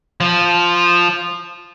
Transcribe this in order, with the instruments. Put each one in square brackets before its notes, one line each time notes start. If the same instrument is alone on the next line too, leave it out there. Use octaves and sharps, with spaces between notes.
[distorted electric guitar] F3